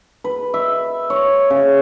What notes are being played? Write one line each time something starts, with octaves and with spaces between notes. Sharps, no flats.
B4
E5
C#5
C#3